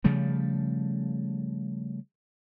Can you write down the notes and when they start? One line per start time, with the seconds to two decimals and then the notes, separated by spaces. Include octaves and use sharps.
0.04 C#3 F3 G3 A3